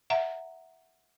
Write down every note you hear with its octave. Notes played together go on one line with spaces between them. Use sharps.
E5 F#5 A#5